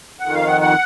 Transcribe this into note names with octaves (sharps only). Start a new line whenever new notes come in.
F2 D#3 F#5
F5
F#5
F#5